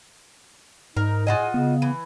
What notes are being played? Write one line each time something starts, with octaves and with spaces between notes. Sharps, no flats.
G#2 D#4 A#4
A2 F4 F#4 G#4 D#5 G#5
C#3 B3
E3